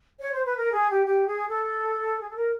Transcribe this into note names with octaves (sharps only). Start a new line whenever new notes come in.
C#5
C5
B4
A#4
G#4
G4
G4
G#4
A4
G#4
A4
A#4